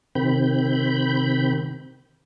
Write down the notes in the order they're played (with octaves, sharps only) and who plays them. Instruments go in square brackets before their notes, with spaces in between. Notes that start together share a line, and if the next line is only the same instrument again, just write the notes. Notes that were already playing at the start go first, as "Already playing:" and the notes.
[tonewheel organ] C3 D#3 C4 B5 G6